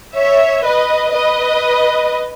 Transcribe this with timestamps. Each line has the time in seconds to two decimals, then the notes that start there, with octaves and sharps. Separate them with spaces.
0.16 C#5 E5
0.65 B4 D#5
1.13 B4 D#5